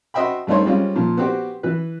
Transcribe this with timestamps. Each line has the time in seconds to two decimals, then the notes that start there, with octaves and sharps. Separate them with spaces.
0.14 F#4 C5 D#5 E5 G5 B5
0.47 G2 A3 D#4 C5 C#5
0.66 G3 G#3 C4 C#4 F4
0.96 A#2 F3
1.17 B3 C4 F#4 G4 C5
1.63 E3 B4